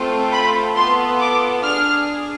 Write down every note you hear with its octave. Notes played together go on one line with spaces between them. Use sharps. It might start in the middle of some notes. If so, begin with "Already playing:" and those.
Already playing: A3 C4 F4 A4
B5
B3 F4 A4 C6
D6
D4 G#4 F6